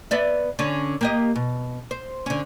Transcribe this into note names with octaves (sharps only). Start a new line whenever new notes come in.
B3 D5 E5
D3 C#4
A#3 G4 D#5
B2
C5
D3 C#4